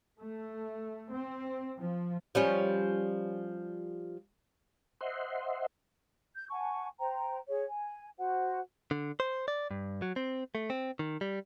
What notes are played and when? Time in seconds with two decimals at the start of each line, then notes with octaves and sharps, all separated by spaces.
0.19 A3
1.13 C4
1.78 F3
2.35 F3 G3 C#4
5.01 C5 D#5 E5 F#5 C6
6.35 G6
6.50 F#5 G#5 A5 C#6
6.99 C5 G5 A#5
7.49 G#4 C#5
7.67 G#5
8.19 F#4 C5 F#5
8.91 D3
9.20 C5
9.48 D5
9.71 G2
10.02 F#3
10.16 C4
10.55 A3
10.70 C4
10.99 D#3
11.21 G3